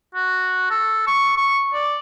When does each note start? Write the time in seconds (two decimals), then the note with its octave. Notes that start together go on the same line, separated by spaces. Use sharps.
0.15 F#4
0.71 A4
1.07 C#6
1.37 C#6
1.74 D5